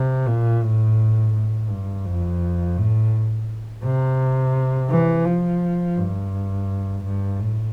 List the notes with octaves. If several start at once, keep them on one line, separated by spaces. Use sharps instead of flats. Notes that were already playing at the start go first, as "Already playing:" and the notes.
Already playing: C3
A#2
A2
A2
G2
F2
A2
C3
E3
F3
G2
G2
A2